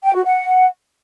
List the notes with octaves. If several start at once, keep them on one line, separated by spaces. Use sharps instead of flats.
G5
F#4
F#5